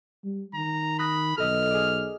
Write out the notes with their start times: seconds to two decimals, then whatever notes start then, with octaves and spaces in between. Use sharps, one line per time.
0.24 G3
0.54 D#3 A#5
0.99 B5 D#6 F#6 A#6
1.38 B1 A4 D#5 E6 F6
1.70 G#4 D5